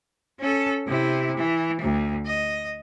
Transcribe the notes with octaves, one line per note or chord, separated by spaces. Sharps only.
C#4 A4
C3 E4
E3
D2
D#5